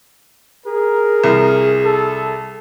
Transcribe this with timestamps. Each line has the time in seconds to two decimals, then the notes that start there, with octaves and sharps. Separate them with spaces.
0.66 G#4 A#4
1.24 C2
1.85 A4